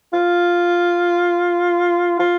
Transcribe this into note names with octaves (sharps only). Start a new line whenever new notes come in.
F4
F4